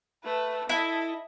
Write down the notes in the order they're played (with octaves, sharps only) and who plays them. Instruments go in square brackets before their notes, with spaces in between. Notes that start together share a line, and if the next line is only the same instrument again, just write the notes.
[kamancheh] A3 B4
[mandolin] E4 [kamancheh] A4 D#5